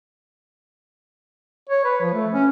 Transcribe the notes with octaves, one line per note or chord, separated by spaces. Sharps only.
C#5
B4
F3
A3
C#4